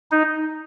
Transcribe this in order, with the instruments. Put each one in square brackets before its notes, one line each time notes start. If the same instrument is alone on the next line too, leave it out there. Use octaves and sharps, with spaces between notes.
[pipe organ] D#4